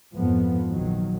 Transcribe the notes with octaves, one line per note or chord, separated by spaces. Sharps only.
F2 G#2 F3 B3
A#1 D#3 F#3